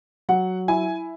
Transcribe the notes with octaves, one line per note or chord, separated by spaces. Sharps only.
F#3 F#5
E4 G#5